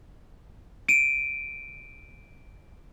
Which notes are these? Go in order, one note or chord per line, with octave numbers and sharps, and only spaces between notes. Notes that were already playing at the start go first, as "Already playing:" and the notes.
D7 D#7